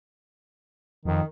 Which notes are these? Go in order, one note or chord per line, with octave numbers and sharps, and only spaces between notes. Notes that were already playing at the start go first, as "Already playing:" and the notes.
F2 D#3